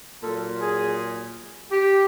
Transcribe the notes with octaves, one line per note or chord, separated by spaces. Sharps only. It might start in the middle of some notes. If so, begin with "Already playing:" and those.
A#2 F#3 A4
G#4
G4